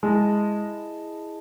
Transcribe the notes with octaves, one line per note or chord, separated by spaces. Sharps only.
G#3 E4 G#4 D#5 A5